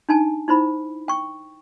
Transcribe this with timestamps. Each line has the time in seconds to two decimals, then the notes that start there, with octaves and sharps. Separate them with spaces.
0.09 D4 D#4 G#5 A5
0.48 D#4 E4 C5 B5
1.08 G5 C#6